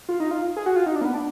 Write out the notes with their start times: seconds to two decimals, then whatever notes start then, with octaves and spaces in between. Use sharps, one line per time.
0.09 F4
0.20 D#4
0.31 F4
0.57 G#4
0.66 F#4
0.76 F4
0.86 D#4
0.95 D4
1.01 A#3
1.05 B3
1.14 D4